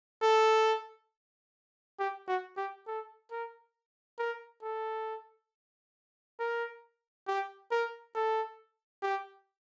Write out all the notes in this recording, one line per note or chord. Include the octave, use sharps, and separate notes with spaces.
A4
G4
F#4
G4
A4
A#4
A#4
A4
A#4
G4
A#4
A4
G4